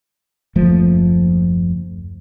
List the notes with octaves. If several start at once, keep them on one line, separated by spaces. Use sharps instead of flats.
F#1 D#2 F3 A3